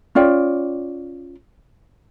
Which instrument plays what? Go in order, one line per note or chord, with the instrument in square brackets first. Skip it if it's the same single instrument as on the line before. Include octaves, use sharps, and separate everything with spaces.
[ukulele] C#4 F4 D5 G5